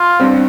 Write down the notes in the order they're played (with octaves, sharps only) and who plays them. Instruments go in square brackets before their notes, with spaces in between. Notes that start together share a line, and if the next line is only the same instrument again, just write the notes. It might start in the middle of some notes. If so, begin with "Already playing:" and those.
Already playing: [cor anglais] F4
[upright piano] G2 G3 C4